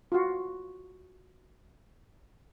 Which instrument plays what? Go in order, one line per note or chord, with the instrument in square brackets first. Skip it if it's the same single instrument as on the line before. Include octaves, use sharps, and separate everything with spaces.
[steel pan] F4 F#4